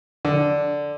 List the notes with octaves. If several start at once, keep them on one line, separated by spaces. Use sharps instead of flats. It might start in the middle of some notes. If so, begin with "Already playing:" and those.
D3